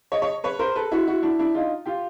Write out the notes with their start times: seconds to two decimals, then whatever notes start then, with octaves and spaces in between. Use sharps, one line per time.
0.12 C#5 D#5
0.22 C#5 D#5
0.44 B4 C#5
0.59 A#4 C5
0.76 A4 B4
0.91 E4 F#4
1.07 E4 F#4
1.22 D4 E4
1.39 D4 E4
1.55 D#4 F4
1.86 F4 G4